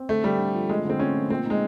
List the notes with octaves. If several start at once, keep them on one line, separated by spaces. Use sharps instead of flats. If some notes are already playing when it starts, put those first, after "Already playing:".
Already playing: C4
D3 A3
D3 G3
D3
F3
G#3 A3
D3 C4
A3 C#4
F3
A#2 C4
G#3 D#4